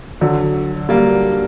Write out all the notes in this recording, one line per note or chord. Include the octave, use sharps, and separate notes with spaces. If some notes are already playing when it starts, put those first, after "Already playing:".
D3 F#3
G3 A#3